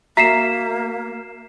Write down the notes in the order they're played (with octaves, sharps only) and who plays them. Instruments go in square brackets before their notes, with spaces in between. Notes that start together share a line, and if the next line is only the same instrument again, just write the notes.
[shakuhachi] A#3 [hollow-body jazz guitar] F#4 E5 A#5 [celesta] B6 C7 E7